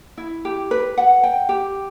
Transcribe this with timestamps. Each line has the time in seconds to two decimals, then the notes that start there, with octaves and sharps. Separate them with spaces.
0.17 E4
0.45 G4
0.71 B4
0.98 F#5
1.23 G5
1.49 G4